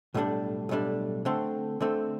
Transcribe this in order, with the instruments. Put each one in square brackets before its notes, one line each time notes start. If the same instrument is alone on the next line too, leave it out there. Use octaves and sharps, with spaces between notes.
[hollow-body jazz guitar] B1 A2 G3 D4
B1 A2 G3 D4
D3 A3 C4
D3 A3 C4